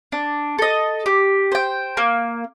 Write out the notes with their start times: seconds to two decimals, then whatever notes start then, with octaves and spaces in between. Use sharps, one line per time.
0.12 D4
0.59 A4 D#5
1.06 G4
1.52 C5 G5
1.97 A#3